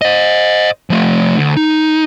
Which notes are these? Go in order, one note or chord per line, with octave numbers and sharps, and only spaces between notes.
C5 D#5
F3 A3
D2
D#4